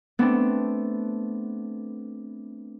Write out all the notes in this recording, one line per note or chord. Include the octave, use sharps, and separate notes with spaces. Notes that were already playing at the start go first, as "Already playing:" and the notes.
A3 B3 C4 D4